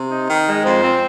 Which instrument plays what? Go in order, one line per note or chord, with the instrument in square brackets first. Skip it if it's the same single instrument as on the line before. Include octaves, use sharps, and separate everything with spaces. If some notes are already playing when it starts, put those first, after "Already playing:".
Already playing: [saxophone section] C3
D#4
D#3
G#3
[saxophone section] F2 [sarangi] C5
[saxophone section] C4